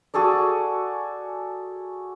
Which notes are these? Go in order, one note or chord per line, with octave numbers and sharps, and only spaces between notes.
F#4 G#4 A4 D5